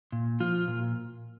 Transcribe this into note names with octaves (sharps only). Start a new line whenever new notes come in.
A#2
F3 F4
A#2